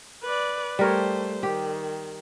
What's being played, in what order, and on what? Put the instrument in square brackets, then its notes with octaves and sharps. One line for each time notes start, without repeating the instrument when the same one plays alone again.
[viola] B4 D5
[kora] G3 A#4 C#5 [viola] A3 C5
[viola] D#3 [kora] G4